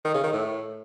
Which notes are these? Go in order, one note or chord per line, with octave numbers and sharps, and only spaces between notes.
D#3
C#3
D#3
A2